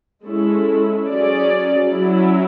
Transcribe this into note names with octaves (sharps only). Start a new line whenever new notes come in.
G#3 C#4 E4 A4
F#3 C#4 G#4 D5
F#3 C#4 E4